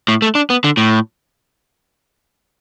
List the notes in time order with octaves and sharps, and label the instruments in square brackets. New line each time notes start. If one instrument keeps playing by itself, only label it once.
[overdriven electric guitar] A2
A3
D4
B3
D3
A2